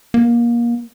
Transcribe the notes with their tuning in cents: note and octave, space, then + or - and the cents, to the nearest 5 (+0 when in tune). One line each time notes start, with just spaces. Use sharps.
A#3 +25